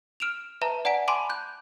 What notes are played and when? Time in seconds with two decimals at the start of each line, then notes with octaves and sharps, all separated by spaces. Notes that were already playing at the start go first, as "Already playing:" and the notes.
0.20 F6 D7 E7 F7
0.61 B4 E5 A5 A#5
0.85 D5 F#5 G#5 A#5 B6 D7
1.08 G#5 A5 B5 C6 D6 D7
1.29 F#6 G6